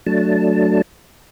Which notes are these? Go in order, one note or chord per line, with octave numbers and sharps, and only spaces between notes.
F#3 A3 D4 A5